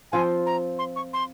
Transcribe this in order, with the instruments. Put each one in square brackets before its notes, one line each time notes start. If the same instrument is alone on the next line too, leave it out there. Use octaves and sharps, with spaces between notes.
[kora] F3 C4 F4 [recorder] G#5
[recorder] A#5
C6
C#6
C6